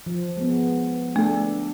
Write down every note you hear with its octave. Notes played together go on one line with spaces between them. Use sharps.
F3
G#3 B3
A3 D4 A4